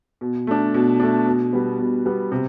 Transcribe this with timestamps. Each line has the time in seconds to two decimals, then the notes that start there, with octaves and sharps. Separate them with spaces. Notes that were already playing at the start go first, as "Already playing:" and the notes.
0.21 B2
0.47 A3 D4
0.74 B2
1.00 A3 D4
1.26 B2
1.53 G3 B3
1.79 B2
2.06 G3 B3
2.32 C3